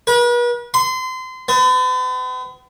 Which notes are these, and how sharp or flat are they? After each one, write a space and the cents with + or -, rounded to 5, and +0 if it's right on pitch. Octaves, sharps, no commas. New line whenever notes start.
B4 -40
C6 -30
B3 +45